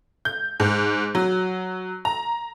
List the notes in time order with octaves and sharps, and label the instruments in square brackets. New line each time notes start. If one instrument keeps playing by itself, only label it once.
[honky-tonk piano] G6
G#2
F#3
A#5